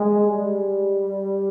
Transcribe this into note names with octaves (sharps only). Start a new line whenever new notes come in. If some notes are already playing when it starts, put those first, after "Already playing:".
Already playing: G#3
G3